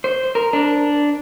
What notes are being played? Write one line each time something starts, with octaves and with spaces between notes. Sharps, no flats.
C5
A#4
D4